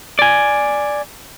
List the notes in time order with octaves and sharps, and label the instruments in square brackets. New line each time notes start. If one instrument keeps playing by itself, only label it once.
[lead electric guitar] D5 G#5